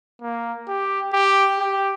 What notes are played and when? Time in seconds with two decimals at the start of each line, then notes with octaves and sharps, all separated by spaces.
0.22 A#3
0.68 G4
1.13 G4
1.59 G4